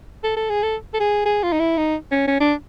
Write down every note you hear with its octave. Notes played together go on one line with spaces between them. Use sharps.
A4
A4
G#4
A4
A4
G#4
G#4
F4
D#4
E4
D#4
C#4
C#4
D4